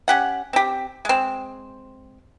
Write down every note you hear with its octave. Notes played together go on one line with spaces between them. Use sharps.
C#4 G4 F#5
C4 G4
G#3 C4